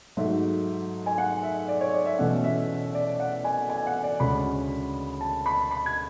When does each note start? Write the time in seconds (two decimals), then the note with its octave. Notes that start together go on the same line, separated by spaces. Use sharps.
0.17 G#2 F#3 A3 E5
1.06 G#5
1.18 F#5
1.43 E5
1.68 D5
1.81 C#5
1.93 D5
2.06 E5
2.18 E2 B2 A3 C#4 F#5
2.44 E5
2.94 D5
3.20 F#5
3.44 G#5
3.70 G#5
3.87 F#5
4.03 D5
4.20 D2 C#3 G#3 C#4 B5
5.21 A5
5.46 B5
5.71 B5
5.86 G#6